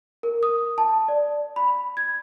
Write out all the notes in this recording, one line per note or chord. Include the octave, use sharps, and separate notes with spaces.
A#4
D#6
A5
D5
B5
G#6